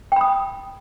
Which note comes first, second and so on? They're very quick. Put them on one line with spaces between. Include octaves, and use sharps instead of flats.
G5 B5 D#6